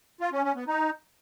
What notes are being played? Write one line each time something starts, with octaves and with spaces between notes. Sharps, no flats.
F4
C#4
C#4
B3
D#4